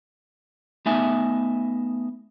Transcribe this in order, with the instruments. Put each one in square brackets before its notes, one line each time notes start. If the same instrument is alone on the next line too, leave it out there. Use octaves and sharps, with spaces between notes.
[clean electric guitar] A3 B3 D#4 E5 G#5